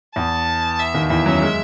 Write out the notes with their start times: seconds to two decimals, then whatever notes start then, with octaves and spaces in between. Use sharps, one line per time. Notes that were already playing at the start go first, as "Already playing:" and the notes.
0.16 E2 A5
0.79 E5
0.94 D#2 D#3
1.10 E2 E3 E5
1.26 F#2 F#3
1.42 G#3